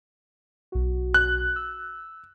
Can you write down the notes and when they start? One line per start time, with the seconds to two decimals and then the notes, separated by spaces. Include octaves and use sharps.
0.72 B1 F#4
1.14 F#6
1.56 E6